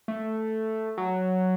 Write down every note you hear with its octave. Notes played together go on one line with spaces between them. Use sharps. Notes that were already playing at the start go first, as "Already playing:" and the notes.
A3
F#3